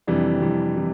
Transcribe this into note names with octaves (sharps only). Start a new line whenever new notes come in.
F2 C3 E3 G3 D4
F2 C3 E3 G3
C3 E3